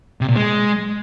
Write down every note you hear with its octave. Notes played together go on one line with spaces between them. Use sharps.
C3
A#2
G#3